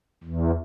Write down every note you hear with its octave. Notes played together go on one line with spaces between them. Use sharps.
E2